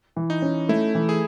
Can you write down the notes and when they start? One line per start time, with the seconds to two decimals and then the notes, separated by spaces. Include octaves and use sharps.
0.16 E3
0.30 D#4
0.42 C#4
0.69 A3 E4
0.95 E3
1.09 G#4